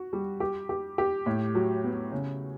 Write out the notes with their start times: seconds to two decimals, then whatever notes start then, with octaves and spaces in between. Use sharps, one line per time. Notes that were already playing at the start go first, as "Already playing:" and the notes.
Already playing: F#4
0.13 G3
0.40 G4
0.69 G4
0.98 G4
1.26 A2
1.55 F#3
1.84 B3
2.12 C#3